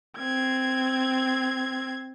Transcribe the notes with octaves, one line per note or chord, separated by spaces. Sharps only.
C4 G#6